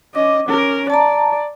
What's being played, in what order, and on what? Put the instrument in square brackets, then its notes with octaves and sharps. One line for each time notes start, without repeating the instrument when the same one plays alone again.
[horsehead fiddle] C#4 D#5 [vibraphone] D6
[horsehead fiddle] C#4 A#4
[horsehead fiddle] D5 [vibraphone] A5 A#5